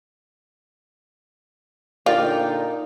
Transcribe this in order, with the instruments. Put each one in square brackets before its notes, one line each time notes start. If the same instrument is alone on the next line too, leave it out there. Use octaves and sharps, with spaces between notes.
[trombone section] A#2 D3 D#4 [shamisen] F4 [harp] A#4 D5 G5